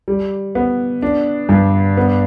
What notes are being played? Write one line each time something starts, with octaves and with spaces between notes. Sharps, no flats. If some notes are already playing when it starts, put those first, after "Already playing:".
G3
B3
D4
G2
B3